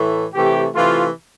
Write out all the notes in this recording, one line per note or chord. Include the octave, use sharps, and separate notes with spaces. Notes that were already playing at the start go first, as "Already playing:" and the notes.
Already playing: A2 E3 A3
C3 E3 A3 G4
C3 E3 A3 F4